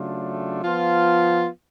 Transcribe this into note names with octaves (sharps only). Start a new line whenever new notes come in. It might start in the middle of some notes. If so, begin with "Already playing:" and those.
Already playing: C#3 F#3 A3 D4 F4
F3 B3 F4